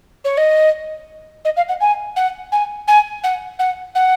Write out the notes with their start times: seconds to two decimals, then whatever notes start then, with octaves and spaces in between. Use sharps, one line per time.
0.25 C#5
0.37 D#5
1.45 D#5
1.57 F5
1.69 F#5
1.81 G#5
2.16 F#5
2.52 G#5
2.88 G#5
3.24 F#5
3.59 F#5
3.95 F#5